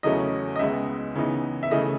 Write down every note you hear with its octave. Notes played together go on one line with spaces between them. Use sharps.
E2 C#3 F#3 A3 C#4 D#5
D#5
C#2 C#3 G#3 B3 E5
C#3 E3 B3 D#4
E5
C#3 E3 A3 D#5